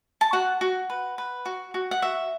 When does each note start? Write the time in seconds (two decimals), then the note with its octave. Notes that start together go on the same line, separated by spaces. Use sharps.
0.21 A5
0.33 F#4 F#5
0.61 F#4
0.90 B4
1.18 B4
1.46 F#4
1.74 F#4
1.91 F#5
2.02 F#4 E5